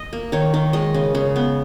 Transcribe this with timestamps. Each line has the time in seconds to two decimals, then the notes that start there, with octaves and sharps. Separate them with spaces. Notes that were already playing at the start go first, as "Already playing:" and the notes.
Already playing: D#5
0.13 A#3
0.32 D#3 C#5
0.54 D#3
0.73 G#3 D#5
0.94 C#3
1.15 C#3
1.36 B3